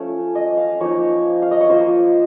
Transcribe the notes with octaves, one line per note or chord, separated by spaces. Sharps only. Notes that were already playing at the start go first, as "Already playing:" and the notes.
Already playing: F3 A3 C#4
D#5
F5
F3 A#3 D#4 C#5
F5
D#5
C#5
F3 A#3 F4 C5